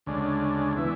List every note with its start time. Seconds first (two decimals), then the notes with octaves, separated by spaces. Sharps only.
0.06 D2 C#3 G#3 D4
0.76 E3 B3 E4